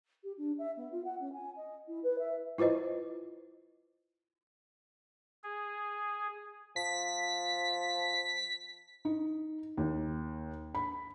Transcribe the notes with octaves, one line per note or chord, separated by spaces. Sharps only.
G4
D4
E5
B3
F4
F#5
C#4
G#5
D#5
E4
B4
E5
E4 F4 B4 C5 D#5
G#4
F3 B6
D#4
D#2
B5